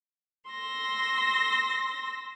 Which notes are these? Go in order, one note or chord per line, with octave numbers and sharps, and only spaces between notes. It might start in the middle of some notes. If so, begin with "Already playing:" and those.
C6 E6 A#6